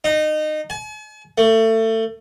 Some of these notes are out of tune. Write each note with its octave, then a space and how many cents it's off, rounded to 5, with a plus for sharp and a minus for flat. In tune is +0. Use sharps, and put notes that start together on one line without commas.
D#4 -20
G#5 +45
A3 +25